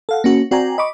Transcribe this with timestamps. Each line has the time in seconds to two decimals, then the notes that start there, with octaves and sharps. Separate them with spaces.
0.09 A4 F5 F#5
0.24 A#3 C#4 F#4
0.51 C4 F#4 D5 G5 G#5 A#5
0.78 D#5 B5 C#6 D6